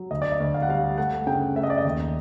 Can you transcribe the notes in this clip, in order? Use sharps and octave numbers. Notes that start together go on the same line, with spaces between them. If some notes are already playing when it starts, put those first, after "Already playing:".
Already playing: F#3
D2 D#5
D5
D#5
D2
F5
F#5
G3 F5
A3 F#5
C#3 G5
A3 E5
D#5
D5
D#5
D#2